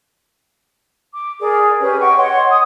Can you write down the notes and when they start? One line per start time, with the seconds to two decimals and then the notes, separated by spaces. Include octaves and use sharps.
1.13 D6
1.40 G#4 A#4 D5
1.79 C#4 G4 G#4 B4
2.00 D#5 F#5 G5 C#6
2.16 C#5 D#5 F#5 C6
2.50 D#6